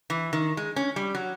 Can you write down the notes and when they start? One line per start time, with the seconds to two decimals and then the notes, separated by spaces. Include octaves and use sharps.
0.10 E3
0.33 D#3
0.57 G#3
0.76 C#4
0.96 G3
1.15 F#3